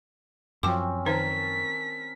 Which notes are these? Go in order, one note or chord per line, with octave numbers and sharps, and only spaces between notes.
F#2 F3 C4 C#4 G5 D6
D#3 D#4 A#4 C5 G#5 A5 B6